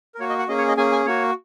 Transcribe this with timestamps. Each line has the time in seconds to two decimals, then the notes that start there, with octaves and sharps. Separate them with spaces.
0.15 A#4
0.19 A#3 F#4 C#5
0.29 D#5
0.39 F#5
0.48 A#3 C#4 G#4 D#5
0.58 C#5
0.68 D#5
0.77 A#3 C#4 G#4 G#5
0.92 G#5
1.05 A#3 F#4 C#5